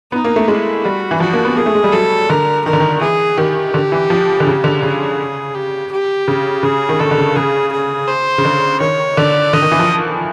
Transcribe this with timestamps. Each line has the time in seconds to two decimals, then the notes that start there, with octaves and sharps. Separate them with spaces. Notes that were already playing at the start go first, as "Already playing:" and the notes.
0.12 B3 D#4
0.24 A#3
0.36 A3
0.48 G#3 E4
0.84 G3 F#4
1.11 E3
1.20 F3 F#4
1.33 A#3
1.45 B3
1.57 A#3 G#4
1.66 A3
1.75 G#3
1.84 G3
1.93 F#3 A4
2.30 D3 A#4
2.65 D#3 A#4
2.73 D3
2.80 D#3
3.01 E3 G#4
3.38 D#3 G4
3.74 D3
3.92 E3
4.10 F3
4.40 D3
4.47 C#3
4.64 D3
4.82 C#3 G#4
5.55 G4
5.91 G4
6.28 C#3
6.63 C#3 G#4
6.89 D#3
6.99 D3 A4
7.11 D3
7.17 C#3
7.36 C#3 G#4
7.72 G#4
8.08 C5
8.38 C#3
8.45 D3
8.80 D#3 C#5
9.17 D3 D5
9.53 D3 D#5
9.62 D#3
9.72 E3
9.79 F3